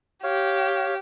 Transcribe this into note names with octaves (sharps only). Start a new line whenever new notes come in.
G4 C#5 F5